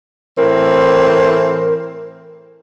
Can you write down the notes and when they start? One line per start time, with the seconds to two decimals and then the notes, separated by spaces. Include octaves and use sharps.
0.37 A2 E3 C4 A#4